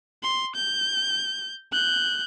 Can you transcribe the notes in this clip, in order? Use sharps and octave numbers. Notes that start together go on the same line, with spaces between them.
C6
G6
F#6 G6